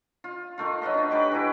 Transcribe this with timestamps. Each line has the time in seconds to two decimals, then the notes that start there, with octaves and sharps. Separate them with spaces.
0.24 F4
0.58 D#3 A3 F4
0.82 F#3 F#4 B4 D#5
0.94 D4 D#4
1.10 F#4 G4 B4 D6
1.31 E3 E4